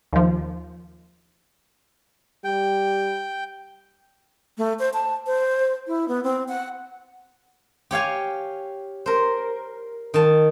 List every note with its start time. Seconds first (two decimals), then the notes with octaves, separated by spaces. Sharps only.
0.13 D#2 F3
2.44 G3 G5
4.58 A3
4.79 C5
4.93 A5
5.26 C5
5.87 E4
6.08 B3
6.24 C4
6.48 F#5
7.91 G4 C#5 F5 G#5
9.06 A#4 C5
10.14 D#3 A5